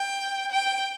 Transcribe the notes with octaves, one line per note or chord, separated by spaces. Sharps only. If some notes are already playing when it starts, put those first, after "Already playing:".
Already playing: G5
G5